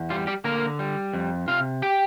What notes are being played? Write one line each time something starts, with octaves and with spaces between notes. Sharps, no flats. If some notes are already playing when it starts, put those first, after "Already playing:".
Already playing: E2
G3 F4
G3 G4
D3 A#3 A#4
G3
F2
C3 F4 F5
G4 G5